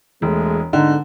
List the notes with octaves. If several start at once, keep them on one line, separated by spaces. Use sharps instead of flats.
E1 G#3 A3
G#2 D3 B3 D#4